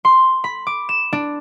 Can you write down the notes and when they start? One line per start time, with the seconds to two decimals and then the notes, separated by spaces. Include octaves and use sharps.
0.05 C6
0.44 B5
0.67 D6
0.89 E7
1.13 D4